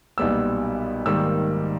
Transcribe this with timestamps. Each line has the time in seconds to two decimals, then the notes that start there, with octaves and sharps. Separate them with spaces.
0.18 B1 A#2 G3 B3 E6
1.06 G#2 D#3 G3 A#3 E6